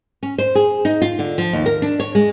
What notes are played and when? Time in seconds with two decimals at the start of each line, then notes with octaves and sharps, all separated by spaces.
0.23 C#4
0.38 C5
0.55 G#4
0.85 D#4
1.02 F4
1.19 D3
1.38 F3
1.53 D#2
1.66 A#4
1.82 D4
2.00 C#5
2.15 G#3